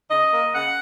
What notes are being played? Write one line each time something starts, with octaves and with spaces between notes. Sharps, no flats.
C#3 D#5
A#3
C#3 F#5